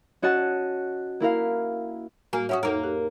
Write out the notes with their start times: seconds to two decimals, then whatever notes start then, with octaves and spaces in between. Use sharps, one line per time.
0.22 C#4 F#4 D#5 F#5 A5
1.20 A#3 E4 A#4 F5
2.33 A2 A#3 F#4 G#5
2.49 C#4 E4 F#4 E5 F#5 D#6
2.63 F2 A#3 D#4 A4 A#4
2.84 G4